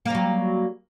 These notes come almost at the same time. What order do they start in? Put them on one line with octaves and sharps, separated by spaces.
A#3 G3 F#3